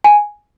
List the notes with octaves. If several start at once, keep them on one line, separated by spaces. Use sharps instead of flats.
G#5